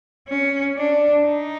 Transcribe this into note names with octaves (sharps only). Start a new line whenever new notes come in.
C#4
D4
D#4